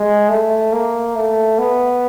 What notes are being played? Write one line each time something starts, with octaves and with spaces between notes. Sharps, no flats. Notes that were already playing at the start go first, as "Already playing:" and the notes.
Already playing: G#3
A3
A#3
A3
B3